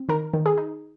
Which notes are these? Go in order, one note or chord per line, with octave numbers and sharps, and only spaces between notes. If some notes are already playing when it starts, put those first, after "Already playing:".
Already playing: C4
D#3 A#4
D#3
G#4
D#4